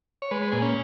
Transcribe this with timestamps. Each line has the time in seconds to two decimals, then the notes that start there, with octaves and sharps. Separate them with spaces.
0.22 C#5
0.31 G#3 B4
0.42 B4
0.52 A#2 G#4
0.62 C#4